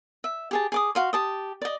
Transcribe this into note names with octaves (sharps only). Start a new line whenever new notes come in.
E5
G4 G#4 A5
G#4 D6 D#6
F#4 F5 C6
G4 A5 D#6
D5 D#5